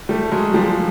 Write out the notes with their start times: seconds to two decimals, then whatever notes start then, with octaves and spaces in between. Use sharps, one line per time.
0.09 G3 A3
0.31 F#3 G#3
0.54 F3 G3